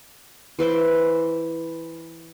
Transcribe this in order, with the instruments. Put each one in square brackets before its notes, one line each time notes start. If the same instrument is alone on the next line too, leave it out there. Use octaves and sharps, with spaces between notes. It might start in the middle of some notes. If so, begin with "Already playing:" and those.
[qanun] E3 B4 C5 D6